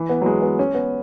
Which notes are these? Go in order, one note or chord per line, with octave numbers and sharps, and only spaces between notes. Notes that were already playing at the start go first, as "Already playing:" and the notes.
Already playing: E3
B3
F#3
G#3
B3
C#4
B3